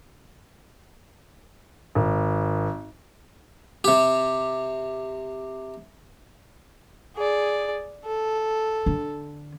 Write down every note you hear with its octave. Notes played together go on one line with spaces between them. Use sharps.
G#1
C3 G4
G#4 D5
A4
D3